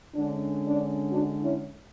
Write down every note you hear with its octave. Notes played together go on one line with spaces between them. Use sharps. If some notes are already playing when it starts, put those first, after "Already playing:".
D3 G#3 C#4 D4
D4
D4 F#4
C#4 E4